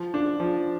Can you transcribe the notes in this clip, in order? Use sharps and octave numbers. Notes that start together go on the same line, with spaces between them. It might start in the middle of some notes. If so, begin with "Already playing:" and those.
Already playing: F3
D4
F3